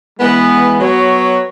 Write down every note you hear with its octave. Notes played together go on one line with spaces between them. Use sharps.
E3 G#3 B3
F#3 B3 F#4 C#5